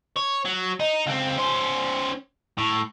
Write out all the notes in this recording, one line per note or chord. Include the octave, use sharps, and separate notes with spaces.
C#5
F#3
D#4
C#2 C4
C#4 C5
A2